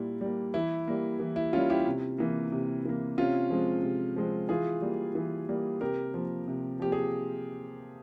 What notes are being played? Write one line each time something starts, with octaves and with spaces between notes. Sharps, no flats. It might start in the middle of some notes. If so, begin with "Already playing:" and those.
Already playing: A#2 G3 A#3 E4
G3 A#3
E3 E4
G3 A#3
E3
E4
G3 A#3 C#4 F4
E4 G4
C3
E3 A#3
C3
E3 A#3
C3 C#4 F4
F3 G#3 C4
C3
F3 G#3 C4
E3 F4 G#4
G3 A#3
E3
G3 A#3
C3 G4 A#4
F3 A#3
C3
F3 A#3 G4
G#4